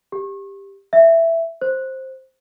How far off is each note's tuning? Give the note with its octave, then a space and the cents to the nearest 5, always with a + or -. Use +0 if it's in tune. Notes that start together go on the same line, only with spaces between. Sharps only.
G4 +15
E5 +5
C5 +10